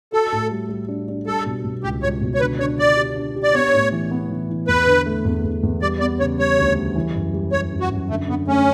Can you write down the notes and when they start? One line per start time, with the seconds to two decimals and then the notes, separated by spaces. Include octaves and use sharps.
0.13 F#4 A4
0.32 A2
0.51 G3
0.69 G3
0.88 D4
1.08 D4
1.27 G3 A4
1.46 B2
1.64 B2
1.84 C#2 G4
2.03 C#2 C#5
2.21 B2
2.34 C#5
2.40 D3 B4
2.59 D4 C#5
2.78 D4 D5
2.97 G4
3.16 D4
3.36 G4
3.43 D5
3.54 B3 C#5
3.74 A2
3.92 E3
4.11 B3
4.30 E3
4.50 E3
4.68 E2 B4
4.87 D3
5.06 A3
5.25 E2
5.44 E2
5.63 E2
5.82 G3 D5
6.00 B3 D5
6.20 C#3 C#5
6.38 G3 C#5
6.58 D2
6.76 G3
6.95 E3
7.14 F#2
7.34 G3
7.52 G3 C#5
7.72 F#2
7.80 F#4
7.91 F#2
8.10 D3 A3
8.28 D3 B3
8.48 A3 C#4